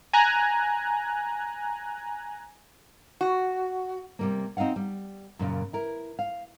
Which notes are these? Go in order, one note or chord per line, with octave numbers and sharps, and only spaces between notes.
G#5 A#5 F#6
F#4
C3 G3 A#3
C4 D#4 D#5 F5 F#5
G3
F#2 A#2 C#3
E4 A#4
F5